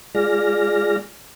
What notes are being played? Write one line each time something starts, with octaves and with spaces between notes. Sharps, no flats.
G#3 F4 G#4 D5 F6 A#6